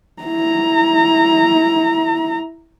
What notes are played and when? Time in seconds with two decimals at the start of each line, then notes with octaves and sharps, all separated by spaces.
0.22 E4 A#5